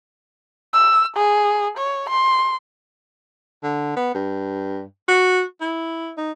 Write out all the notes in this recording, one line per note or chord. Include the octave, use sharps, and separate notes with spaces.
E6
G#4
C#5
C6
D3
B3
G2
F#4
E4
D#4